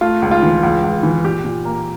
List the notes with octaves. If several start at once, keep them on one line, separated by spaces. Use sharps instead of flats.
A3 F4
C#2
F4
E3
C#2
C#2
E3
A#2 G4
A#2
A#3